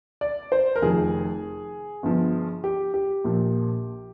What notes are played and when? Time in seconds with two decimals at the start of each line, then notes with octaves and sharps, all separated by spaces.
0.21 D5
0.52 C5
0.76 A#4
0.82 F1 F2 D#3 G#4
2.03 G1 G2 F3
2.64 G4
2.94 G4
3.24 A#1 A#2 F3